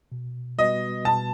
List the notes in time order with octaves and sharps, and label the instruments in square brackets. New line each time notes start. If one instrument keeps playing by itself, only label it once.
[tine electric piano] B2
[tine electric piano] G3 B3 F#4 B4 [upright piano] D#5
[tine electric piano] B2 [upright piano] A5